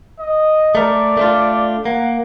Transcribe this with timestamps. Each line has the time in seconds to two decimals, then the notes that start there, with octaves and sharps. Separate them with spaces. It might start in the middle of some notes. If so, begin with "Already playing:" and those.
0.19 D#5
0.75 A3 A#4 D5
1.17 A3 D4 F4
1.85 A#3 F#5